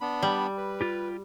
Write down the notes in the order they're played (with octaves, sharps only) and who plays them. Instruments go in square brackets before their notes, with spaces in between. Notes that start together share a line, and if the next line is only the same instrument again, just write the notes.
[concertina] B3 D4 B5
[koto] G3
[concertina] B4
[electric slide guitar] F4 G4